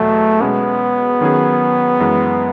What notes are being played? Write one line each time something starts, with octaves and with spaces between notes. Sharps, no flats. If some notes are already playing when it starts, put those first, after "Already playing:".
Already playing: E2 B2 F#3 A3
B2 G#3 B3 C#4
D#3 F#3 C#4 G#4
F#2 E3 G#3